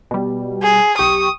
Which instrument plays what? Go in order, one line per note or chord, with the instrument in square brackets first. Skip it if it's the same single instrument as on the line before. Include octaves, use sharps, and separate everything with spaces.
[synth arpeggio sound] B2 G3
[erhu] G#4
[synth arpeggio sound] B1 G4 C#6 [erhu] D#6